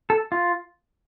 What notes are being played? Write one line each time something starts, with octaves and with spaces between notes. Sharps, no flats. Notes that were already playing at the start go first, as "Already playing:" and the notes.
A4
F4